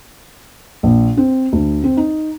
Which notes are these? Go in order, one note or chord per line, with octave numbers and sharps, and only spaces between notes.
A#1
C4
D2
C4
D#4